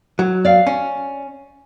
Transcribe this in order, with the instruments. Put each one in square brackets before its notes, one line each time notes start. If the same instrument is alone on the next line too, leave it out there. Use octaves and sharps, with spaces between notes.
[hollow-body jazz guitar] F#3
[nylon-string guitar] D5 F5
[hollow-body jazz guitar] C#4